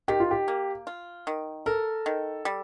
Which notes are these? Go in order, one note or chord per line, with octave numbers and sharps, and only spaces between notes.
D#3 G4
F4
G4
A#3
F4
D#3
A4 A#4
D#3
G3